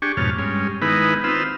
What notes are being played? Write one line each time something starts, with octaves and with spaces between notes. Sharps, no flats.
D4 G4 G#4 C#6
F2 G#2 B2 C#5 A5 F6
G2 G#3 C#4
D#3 G#3 B3 D#4 E4 B4
C4 D#4 F4 B4 E6